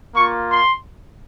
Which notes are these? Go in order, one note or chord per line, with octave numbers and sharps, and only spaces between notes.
A#3 F4 C#6
C6